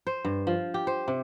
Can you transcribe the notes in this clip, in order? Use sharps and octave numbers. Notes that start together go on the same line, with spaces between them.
C5
G2
F3
G4
C5
C3